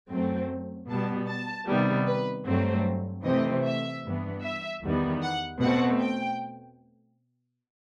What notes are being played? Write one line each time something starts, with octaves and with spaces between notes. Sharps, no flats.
F#2 F#3 A3 C4
B2 G3 B3 A5
A5
C3 D#3 G3 B3
B4
G2 F#3 A3 C4
C3 E3 A3 C4 D#5
E5
G2 E3 B3
E5
E2 D#3 G3 B3
F#5
B2 A3 C4 F#5
G5